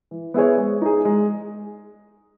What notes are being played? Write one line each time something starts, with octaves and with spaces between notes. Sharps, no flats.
E3
B3 E4 G#4 C#5
G#3
D#4 G#4
G#3